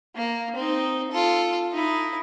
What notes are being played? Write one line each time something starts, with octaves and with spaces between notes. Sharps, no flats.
A#3
C4 D#4
F4 A4
D#4 E4